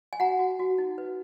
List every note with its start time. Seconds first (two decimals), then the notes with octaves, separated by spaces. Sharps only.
0.13 G#5
0.20 F#4 F#5 A#5
0.39 F#4
0.59 F#4
0.78 D#4
0.98 B4